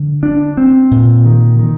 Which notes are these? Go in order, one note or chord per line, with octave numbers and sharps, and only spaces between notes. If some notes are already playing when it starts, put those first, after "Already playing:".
Already playing: D3
D4
C4
A#2
D#3
D#3